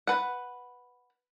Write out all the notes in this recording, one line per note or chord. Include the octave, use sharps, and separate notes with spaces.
B4 F#5